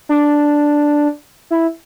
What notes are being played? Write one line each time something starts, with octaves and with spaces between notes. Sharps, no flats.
D4
E4